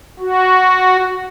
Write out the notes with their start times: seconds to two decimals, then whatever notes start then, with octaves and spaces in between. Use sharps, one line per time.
0.19 F#4